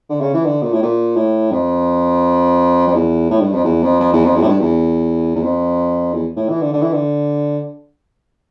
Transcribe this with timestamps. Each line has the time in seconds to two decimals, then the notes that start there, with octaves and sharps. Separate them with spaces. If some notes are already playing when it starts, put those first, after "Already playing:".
0.10 D3
0.21 C#3
0.34 E3
0.45 D3
0.63 A#2
0.73 A2
0.82 A#2
1.16 A2
1.51 F2
2.87 F2
2.94 E2
3.30 A2
3.41 G2
3.53 F2
3.65 E2
3.82 F2
4.00 F2
4.13 E2
4.25 F2
4.36 E2
4.42 A2
4.48 G2
4.60 E2
5.35 E2
5.43 F2
6.13 E2
6.36 A2
6.49 E3
6.61 D3
6.73 D3
6.82 E3
6.93 D3